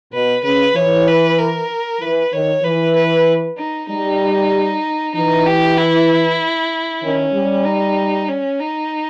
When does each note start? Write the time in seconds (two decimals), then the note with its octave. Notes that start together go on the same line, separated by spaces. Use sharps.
0.13 B2 B4
0.44 C#3 B4
0.75 E3 C#5
1.07 B4
1.39 A#4
2.00 E3 B4
2.33 D#3 C#5
2.63 E3 B4
2.96 B4
3.57 D#4
3.89 G3 D#4
5.14 E3 D#4
5.46 G4
5.77 E4
7.03 D#3 C#4
7.34 G3
7.66 D#4
8.29 C#4
8.60 D#4